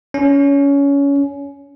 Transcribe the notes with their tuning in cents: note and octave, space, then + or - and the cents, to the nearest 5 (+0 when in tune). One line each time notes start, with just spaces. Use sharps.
C#4 +20